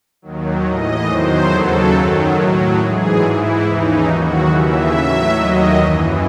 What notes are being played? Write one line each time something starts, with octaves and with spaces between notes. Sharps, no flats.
D#2 D#3 F#3
A2 E3 D#5
E2 D#3 F#3 C5
D#2 C#3 F#3 A4
F#2 D#3 F#3
A2 F#3
G#2 E3 G#4
G#2 E3 E4
D#2 C#3 E3 D#4
D#2 D#3 F#3 F#4
D#2 C#3 E3 E5
A2 F#3 E5
D#2 D#3 F#3 D#5
F#2 E3